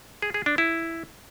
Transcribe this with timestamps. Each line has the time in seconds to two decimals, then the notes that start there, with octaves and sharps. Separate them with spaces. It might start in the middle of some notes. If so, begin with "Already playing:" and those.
0.22 G#4
0.34 G#4
0.46 D4
0.58 E4